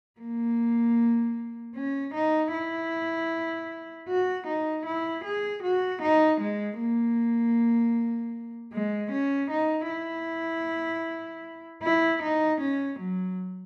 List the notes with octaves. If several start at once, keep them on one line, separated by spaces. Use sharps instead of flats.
A#3
C#4
D#4
E4
F#4
D#4
E4
G#4
F#4
D#4
G#3
A#3
G#3
C#4
D#4
E4
E4
D#4
C#4
F#3